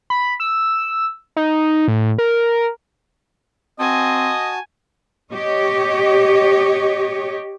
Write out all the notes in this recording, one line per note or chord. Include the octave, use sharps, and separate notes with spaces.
B5
E6
D#4
A2
A#4
C4 F#4 D#5 G#5 A5
G4 C#5 D#5